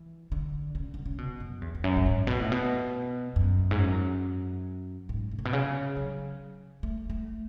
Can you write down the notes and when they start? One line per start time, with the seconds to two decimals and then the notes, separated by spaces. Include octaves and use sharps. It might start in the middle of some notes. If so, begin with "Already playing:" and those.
Already playing: E3
0.32 D3
0.75 C#3
0.94 D3
1.06 C#3
1.18 B2
1.40 F#2
1.62 E2
1.75 E2
1.84 F#2
1.96 A2
2.06 G#2
2.27 B2
2.40 A2
2.52 B2
3.36 F#2
3.71 G#2
3.79 F#2
5.09 G#2
5.31 G#2
5.39 A2
5.45 B2
5.53 C#3
5.96 F#3
6.83 A3
7.10 A3